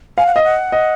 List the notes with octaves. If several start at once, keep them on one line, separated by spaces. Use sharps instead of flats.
F5 G#5
F#5
D#5 F5
F#5
D#5